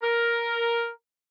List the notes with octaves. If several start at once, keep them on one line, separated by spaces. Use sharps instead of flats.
A#4